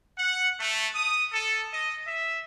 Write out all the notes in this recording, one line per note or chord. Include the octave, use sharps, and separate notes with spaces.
F#5
A3
D#6
A4
D#5
E5